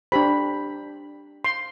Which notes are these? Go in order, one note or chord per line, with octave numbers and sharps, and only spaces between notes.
D4 G4 C5 B5
C6